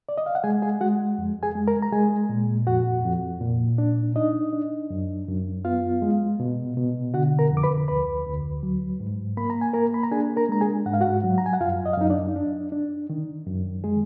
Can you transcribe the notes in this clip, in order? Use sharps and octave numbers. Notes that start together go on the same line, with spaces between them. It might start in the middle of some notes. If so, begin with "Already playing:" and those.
D5
D#5
F5
F#5
G#3 G#4 G#5
G#4 G#5
G#3 F#4 F#5
F2
G#4 G#5
G#3
A#4 A#5
A#5
G#3 G#4 G#5
A#2
F2 F#4 F#5
F2
A#2
D4
D4 D#4 D#5
D4
F#2
F#2
B3 F4 F5
G#3
B2
B2
D3 F#4 F#5
A#4 A#5
F2
D6
B4 B5
D2 B4 B5
D2
F#3
G#2
A#3 B5
A#5
G#5
A#3 A#4 A#5
B5
A#5
D4 G#4 G#5
A#4 A#5
G#3 A#5
G#4 G#5
G#2 F#5
F5
F#4 F#5
F#3
A#5
G#5
F#5
F#2 F4 F5
D#5
F5
F#2 D#4 D#5
D4 D5
D4
D4
D#3
F#2
G#3 G#4